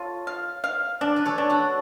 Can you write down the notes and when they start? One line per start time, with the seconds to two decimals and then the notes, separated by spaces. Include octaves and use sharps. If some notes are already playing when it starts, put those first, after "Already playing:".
Already playing: F4 A4 C#5
0.27 F5
0.64 F5
1.01 D4 D5
1.16 B4 D5
1.25 A4 C#5
1.38 D4
1.50 F#4 A4